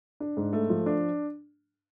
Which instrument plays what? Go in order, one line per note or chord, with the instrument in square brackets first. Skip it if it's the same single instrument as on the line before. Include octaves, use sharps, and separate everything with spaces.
[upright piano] D4
G#2
A3
F3
D4